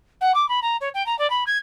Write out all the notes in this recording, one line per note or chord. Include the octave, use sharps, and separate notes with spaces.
F#5
D6
B5
A#5
C#5
G5
A#5
D5
B5
G#6